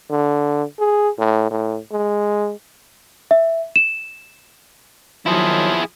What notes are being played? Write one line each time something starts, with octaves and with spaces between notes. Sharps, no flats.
D3
G#4
A2
A2
G#3
E5
E7
D#3 F3 F#3 E4 G#4